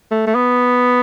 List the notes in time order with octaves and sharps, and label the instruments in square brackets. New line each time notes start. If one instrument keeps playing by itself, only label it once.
[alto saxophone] A3
A3
B3